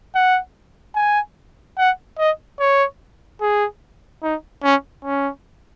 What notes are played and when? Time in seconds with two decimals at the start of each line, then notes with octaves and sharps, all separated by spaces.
0.15 F#5
0.95 G#5
1.78 F#5
2.18 D#5
2.60 C#5
3.41 G#4
4.23 D#4
4.63 C#4
5.05 C#4